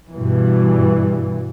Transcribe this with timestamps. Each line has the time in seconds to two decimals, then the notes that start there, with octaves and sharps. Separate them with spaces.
0.11 G2 B2 E3